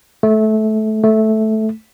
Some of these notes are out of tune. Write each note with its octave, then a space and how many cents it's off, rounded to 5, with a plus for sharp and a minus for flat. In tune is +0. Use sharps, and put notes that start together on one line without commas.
A3 -20
A3 -10